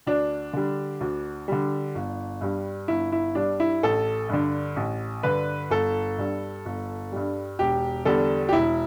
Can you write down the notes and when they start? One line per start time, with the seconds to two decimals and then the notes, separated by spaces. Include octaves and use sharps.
0.06 D2 D4
0.53 D3 G3
1.00 D2
1.48 D3 G3
1.95 G1
2.41 G2 G3
2.88 G1 E4
3.12 E4
3.35 G2 G3 D4
3.60 E4
3.83 A1 A4
4.29 G2 D3
4.76 A1
5.23 G2 D3 B4
5.70 G1 A4
6.18 G2 G3
6.65 G1
7.12 G2 G3
7.59 E1 G4
8.05 E2 D3 G3 A4
8.49 G4
8.53 E1 E4